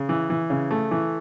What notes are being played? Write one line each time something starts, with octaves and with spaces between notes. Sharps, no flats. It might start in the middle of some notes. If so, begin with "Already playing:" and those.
Already playing: C#3
E3
E3
C#3
A3
E3